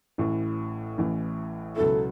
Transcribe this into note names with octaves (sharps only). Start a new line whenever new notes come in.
A1 A2 E3
A1 A2 E3
C#2 B2 F#3 B3 E4 A4